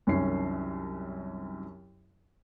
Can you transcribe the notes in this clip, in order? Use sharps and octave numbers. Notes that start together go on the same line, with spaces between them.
C2 F#2 D#3 C#4 C7